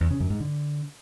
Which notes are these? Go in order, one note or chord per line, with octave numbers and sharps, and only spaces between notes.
E2
C#3
F#2
G#2
D3